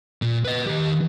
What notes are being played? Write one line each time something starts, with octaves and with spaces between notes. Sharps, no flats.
A#2
B4 D#5
D#3 G4